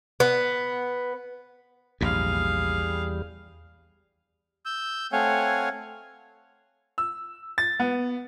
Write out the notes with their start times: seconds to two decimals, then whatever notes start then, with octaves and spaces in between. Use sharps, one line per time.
0.20 B3
2.01 A#1 E2 G#2 G3 G#4 F5
4.66 E6 G6
5.13 A3 C4 C#5 F5 F#5 G#5
6.98 E6
7.58 A6
7.80 B3